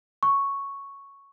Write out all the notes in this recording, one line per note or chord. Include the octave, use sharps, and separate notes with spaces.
C#6